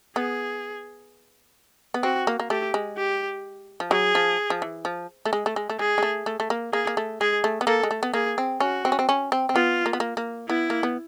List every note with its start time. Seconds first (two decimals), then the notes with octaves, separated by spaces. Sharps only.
0.16 B3 G#4
1.94 B3
2.03 C4 F#4
2.27 A#3
2.40 A#3
2.50 A3 G4
2.74 G#3
2.97 G4
3.80 F3
3.91 F#3 G#4
4.15 F3
4.50 F3
4.62 E3
4.85 F3
5.25 A3
5.33 G#3
5.46 A3
5.56 G#3
5.70 A3
5.79 G#3 G#4
5.98 G#3
6.03 A3
6.26 A3
6.40 A3
6.50 A#3
6.73 A#3 G#4
6.87 A#3
6.97 A3
7.21 G#3 G#4
7.44 A3
7.61 B3
7.67 A#3 A4
7.83 G#3
7.91 A3
8.03 B3
8.14 A#3 G#4
8.38 C4
8.60 C#4 F#4
8.85 C4
8.92 C#4
8.99 C4
9.09 C#4
9.32 C4
9.49 C4
9.55 B3 F4
9.86 A#3
9.93 B3
10.00 A#3
10.17 A#3
10.49 B3 E4
10.70 A#3
10.83 B3